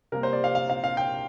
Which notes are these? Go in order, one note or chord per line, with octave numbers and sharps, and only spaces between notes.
C3 G3 A#3 A#4
C5
D5
F5
F5
F5
F5
G5